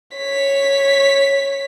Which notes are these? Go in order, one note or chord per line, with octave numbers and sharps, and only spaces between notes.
C#5 B6